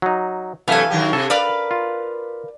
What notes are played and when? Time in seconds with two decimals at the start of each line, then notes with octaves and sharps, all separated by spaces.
0.02 F#3 D#4
0.68 C3 E3 F#3 A3 E5 F5 G#5
0.90 D#3 F#3 G4
1.13 C3 A4
1.30 A#4 B4 D5 F5
1.71 F4